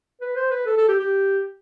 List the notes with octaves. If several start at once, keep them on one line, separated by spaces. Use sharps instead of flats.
B4
C5
B4
A4
A4
G4
G4